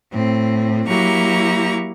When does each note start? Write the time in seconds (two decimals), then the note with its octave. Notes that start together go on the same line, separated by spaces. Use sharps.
0.13 A2 C4
0.88 F#3 A#3 E4 G4 A#5 C#6